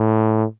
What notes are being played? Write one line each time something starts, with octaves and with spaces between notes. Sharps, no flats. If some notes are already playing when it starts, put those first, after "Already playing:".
Already playing: A2